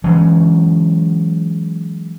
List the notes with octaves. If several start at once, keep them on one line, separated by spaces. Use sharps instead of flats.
E3 F#3 G#3 C#4